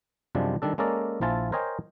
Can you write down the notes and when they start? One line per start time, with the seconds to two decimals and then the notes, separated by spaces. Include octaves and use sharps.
0.35 F#2 C3 F3 G3 G#3 D4
0.62 D#3 G3 D4 A4
0.78 G#3 A#3 C#4 A4 A#4 D5
1.21 A#1 F3 E4 F4 G#5 A5
1.52 A#4 C5 C#5 D#5 G5 G#5